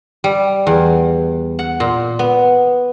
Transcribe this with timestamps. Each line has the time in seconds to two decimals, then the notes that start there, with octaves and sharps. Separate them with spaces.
0.24 G3
0.67 E2
1.59 F#5
1.80 A#2
2.19 B3